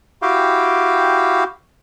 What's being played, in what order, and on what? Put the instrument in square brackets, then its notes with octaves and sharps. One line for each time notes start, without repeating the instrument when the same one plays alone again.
[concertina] E4 F#4 G4 F5 G5